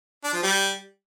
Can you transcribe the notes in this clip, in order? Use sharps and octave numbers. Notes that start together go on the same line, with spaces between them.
D4
F3
G3